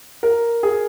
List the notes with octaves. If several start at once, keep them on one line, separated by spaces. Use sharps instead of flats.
A#4
G#4